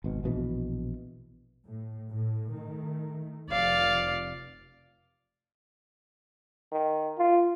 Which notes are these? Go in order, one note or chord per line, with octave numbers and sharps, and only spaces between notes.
G#1 B2
A#1 B2 E3
A2
A2
D#3 A3
F1 D5 F5
D#3
F4